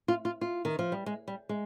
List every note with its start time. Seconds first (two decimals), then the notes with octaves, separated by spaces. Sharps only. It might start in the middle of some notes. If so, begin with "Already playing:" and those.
0.08 F4
0.25 F4
0.41 F4
0.65 D#3
0.79 F3
0.92 G3
1.06 G#3
1.28 G3
1.49 G#3